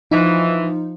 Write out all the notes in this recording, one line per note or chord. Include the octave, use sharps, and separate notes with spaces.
E3 F3 D#4